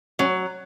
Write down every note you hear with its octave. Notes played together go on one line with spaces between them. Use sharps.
F#3 C#4